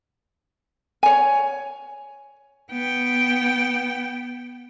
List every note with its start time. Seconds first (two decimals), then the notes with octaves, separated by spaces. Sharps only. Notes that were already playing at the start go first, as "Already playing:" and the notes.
1.03 C#5 G#5
2.71 B3 G5